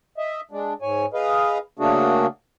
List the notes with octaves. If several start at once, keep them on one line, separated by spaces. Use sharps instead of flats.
D#5 E5
G#3 D4
G#2 C#5 G#5
G#4 B4 D#5 F5
C#3 A3 A#3 D4 F#4 G#4